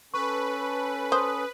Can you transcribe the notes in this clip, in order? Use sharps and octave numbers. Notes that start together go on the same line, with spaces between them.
C#4 A4 B4 C#6
C5 D#6